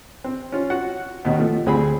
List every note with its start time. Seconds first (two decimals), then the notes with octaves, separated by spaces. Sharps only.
0.24 C4
0.52 C#4 F4
0.70 F#4 F#5
1.25 D#2 B2 D#3
1.38 F3 A3
1.66 D2 C4 G#4 B5